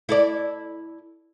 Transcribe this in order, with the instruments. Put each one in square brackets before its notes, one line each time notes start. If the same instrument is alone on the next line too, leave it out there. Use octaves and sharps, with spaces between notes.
[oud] E4 A4 D5